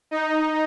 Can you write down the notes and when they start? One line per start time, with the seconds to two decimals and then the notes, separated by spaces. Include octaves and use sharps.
0.11 D#4